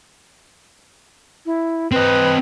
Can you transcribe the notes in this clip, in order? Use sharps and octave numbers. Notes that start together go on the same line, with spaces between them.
E4
C4 B4 D#5